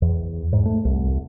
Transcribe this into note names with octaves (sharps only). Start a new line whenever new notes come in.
E2
G#2
A3
C2